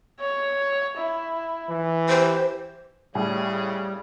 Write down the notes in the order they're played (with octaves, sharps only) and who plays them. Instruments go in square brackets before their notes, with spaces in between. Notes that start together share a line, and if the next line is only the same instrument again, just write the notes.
[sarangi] C#5
E4
[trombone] E3
[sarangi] G4 [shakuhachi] C5
[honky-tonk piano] A2 [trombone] C#3 [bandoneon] G3 [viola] G#4